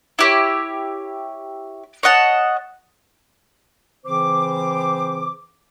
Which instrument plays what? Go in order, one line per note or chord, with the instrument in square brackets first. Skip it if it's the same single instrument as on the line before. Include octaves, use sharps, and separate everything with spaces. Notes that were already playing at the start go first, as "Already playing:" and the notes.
[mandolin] E4 G4 C#5
C#5 D#5 F#5 A5
[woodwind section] C#3 E3 C4 C5 D6